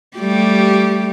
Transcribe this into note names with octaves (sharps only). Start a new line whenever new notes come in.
G3 A3 G4